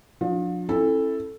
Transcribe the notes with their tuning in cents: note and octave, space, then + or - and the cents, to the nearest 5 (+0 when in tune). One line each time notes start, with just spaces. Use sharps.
F3 +40 D4 -5 F4 +35
C#4 -45 E4 +0 A4 +0